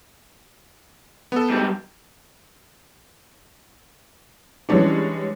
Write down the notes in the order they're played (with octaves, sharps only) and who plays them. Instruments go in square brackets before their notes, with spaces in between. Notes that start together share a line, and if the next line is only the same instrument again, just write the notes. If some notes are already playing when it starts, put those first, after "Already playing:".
[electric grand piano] B3 A4
[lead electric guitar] G#2 G3
[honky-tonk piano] E3 G3 G#3 C#4 D4